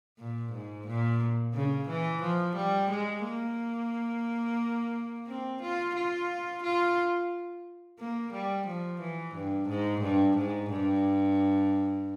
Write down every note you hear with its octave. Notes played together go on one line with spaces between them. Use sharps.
A#2
G#2
A#2
C#3
E3
F3
G3
G#3
A#3
C4
F4
F4
F4
A#3
G3
F3
E3
G2
G#2
G2
G#2
G2